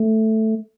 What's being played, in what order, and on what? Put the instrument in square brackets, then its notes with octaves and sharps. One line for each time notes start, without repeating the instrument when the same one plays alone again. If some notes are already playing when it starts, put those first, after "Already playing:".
Already playing: [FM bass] A3